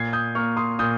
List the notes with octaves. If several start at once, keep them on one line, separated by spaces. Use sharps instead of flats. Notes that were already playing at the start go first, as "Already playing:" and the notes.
Already playing: A#2 G#6 C7
D#6 G6
A#3 C#6 F6
C6 D#6
A#2 D#6 G6